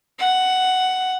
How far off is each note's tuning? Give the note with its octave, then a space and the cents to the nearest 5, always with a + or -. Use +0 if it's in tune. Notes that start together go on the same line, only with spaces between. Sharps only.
F#5 +5